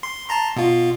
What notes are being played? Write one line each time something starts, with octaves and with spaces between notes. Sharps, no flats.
C6
A5 A#5 C6
B2 F4